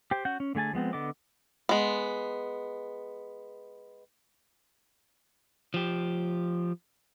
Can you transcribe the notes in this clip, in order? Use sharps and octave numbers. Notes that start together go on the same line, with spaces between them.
G4 C5 G5
C#4 F#4 F#5 G6
C#4
D3 A3 G#4 G#5 A5
F3 G#3 B3 C4
D3 B3 A4 D#5 D6
G#3 B3
F3 G4